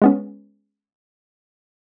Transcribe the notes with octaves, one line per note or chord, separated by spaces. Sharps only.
G#3 B3 C#4